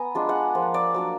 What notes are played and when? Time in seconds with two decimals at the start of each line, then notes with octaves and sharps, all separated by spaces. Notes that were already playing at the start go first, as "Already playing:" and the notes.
Already playing: B3 G#5 A#5
0.15 G#3 D4 F4
0.29 F#5
0.55 F3 A#3 F4
0.74 D5
0.94 F#3 A#3 D4